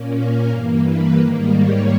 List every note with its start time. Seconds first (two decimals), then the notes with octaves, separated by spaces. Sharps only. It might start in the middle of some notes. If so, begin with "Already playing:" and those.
Already playing: A#2 A#3 C#4
0.16 A#4
0.50 G2 E3 A#3
0.84 B4
1.18 G#2 D#3 G3 A#3
1.53 C#5